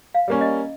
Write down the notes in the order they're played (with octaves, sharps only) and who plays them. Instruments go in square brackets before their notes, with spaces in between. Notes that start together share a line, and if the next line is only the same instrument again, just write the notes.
[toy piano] F5
[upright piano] G3 A#3 C#4
[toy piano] D#5